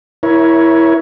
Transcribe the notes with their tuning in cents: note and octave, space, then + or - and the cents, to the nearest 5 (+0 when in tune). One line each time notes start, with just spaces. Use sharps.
E4 +0 A#4 +30 C#5 +5